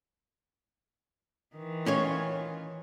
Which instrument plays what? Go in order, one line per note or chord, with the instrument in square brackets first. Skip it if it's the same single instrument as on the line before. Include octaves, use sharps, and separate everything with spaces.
[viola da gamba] D#3 E3
[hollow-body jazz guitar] C#4 F4 C#5